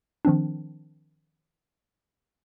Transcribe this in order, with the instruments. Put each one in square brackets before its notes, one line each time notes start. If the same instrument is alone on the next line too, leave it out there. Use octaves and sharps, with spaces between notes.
[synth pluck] D#3 F3 C4 D4